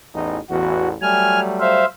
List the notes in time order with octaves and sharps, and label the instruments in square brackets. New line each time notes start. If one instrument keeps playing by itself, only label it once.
[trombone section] A1 E2 D#4
[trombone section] A1 E2 [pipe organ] F#4
[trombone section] F#3 G3 A3 [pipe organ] G#5 F6
[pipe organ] C5 E5 F5